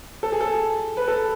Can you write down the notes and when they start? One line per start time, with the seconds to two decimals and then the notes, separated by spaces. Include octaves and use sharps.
0.23 A4
0.32 G#4
0.41 A4
0.97 B4
1.08 A4